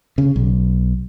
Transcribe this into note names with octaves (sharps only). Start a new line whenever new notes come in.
C#3
B1